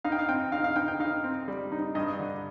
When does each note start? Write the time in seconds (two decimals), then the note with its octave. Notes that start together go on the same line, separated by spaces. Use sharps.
0.04 D#4 F5
0.12 G5
0.19 F5
0.29 C4 G5
0.52 D#4 F5
0.64 F5
0.76 D#4 G5
0.88 G5
1.00 D#4 F5
1.24 C4
1.48 G3
1.72 D#4
1.95 G2 D#5
2.19 D3